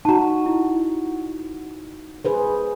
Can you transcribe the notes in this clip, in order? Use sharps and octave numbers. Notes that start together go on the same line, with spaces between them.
D#4 F#4 A5 A#5
E4
G#4 B4 C5